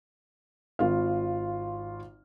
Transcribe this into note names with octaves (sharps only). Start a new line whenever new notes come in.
G#1 F4 F5